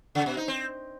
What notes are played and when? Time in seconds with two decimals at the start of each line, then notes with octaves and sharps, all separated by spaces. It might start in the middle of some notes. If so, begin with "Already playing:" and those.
0.15 C#3
0.26 B2
0.37 D#4
0.48 C4